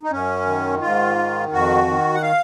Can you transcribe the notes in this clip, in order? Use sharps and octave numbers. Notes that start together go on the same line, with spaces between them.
D#4
F#2 C#4
D#3
G#2 F4
D#3
F2 F#4
D#3
F#5
F5